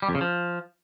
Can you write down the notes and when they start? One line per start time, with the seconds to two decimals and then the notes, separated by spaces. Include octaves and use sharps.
0.02 G3
0.09 F2
0.15 C#3
0.21 F3